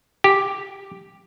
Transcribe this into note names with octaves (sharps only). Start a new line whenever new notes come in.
G4